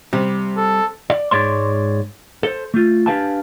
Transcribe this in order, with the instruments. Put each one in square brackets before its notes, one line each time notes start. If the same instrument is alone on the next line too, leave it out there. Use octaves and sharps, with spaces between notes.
[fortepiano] C3 [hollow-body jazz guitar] G3
[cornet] A4
[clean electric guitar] D5
G#2 G#3 C#5 D5 C6
A4 C5
A3 F4
D4 G4 B4 F5 G#5 A5